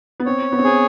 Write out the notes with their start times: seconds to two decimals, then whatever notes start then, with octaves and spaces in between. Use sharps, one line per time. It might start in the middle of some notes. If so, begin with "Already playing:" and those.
0.20 B3
0.26 C4 C#5
0.52 B3
0.59 C4
0.64 B3 G#4